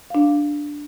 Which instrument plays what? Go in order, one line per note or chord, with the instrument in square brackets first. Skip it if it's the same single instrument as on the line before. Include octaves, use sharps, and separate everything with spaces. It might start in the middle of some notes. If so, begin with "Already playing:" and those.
[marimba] D4 F5